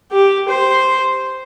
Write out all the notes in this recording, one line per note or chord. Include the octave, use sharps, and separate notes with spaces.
G4
C5